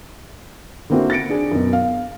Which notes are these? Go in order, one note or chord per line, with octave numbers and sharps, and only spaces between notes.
D3 A#3 C4 E4 F#4
A6 A#6 C#7 D7
D4 G#4
F#2 B2
F5